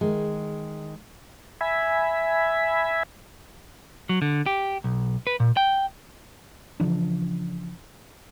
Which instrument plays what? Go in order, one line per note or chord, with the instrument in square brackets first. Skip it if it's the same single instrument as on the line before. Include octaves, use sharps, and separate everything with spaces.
[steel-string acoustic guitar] D#3 G#3
[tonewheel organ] E5 G#5 B5
[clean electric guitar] F#3
D3
G4
B1
B4
A#2
G5
[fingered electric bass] C#3 E3 F3 D4